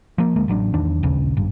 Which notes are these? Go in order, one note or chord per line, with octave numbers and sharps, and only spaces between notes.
F3 A#3
D2 G#3 A#3
A1 F#3 D4
E2 D#3 D4
A#1 D#2 C#3
G#1 G2